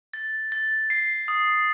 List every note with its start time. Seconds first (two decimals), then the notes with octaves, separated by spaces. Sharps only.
0.14 A6
0.52 A6
0.90 C7
1.28 D#6